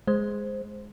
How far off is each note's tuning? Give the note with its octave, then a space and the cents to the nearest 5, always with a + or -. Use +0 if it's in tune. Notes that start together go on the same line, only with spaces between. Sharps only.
G#3 +0 C5 +0